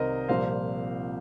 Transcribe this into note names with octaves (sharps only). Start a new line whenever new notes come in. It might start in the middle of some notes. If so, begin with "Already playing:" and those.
Already playing: C2 C3 D#3 G3 A#4 C5 D#5
C2 A#2 F3 C5 F5